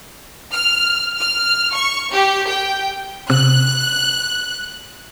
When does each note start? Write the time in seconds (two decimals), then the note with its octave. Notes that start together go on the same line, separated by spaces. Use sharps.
0.52 F6
1.19 F6
1.74 C#6
2.12 G4
2.50 G5
3.30 C3 F#6